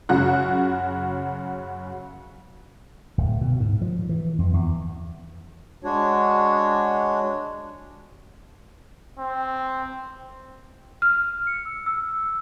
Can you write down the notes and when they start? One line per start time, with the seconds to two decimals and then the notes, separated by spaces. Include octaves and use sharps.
0.09 F#2 C#3 F#4 F#6
3.18 D1
3.41 B2
3.60 G#2
3.82 F3
4.09 E3
4.39 F2
4.53 E2
5.83 G#3 D4 F#4 C#5
9.18 C4
11.02 F6
11.47 C#7
11.65 E6
11.86 E6